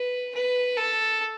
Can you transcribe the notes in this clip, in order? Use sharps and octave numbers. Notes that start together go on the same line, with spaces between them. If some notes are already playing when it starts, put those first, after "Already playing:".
Already playing: B4
B4
A4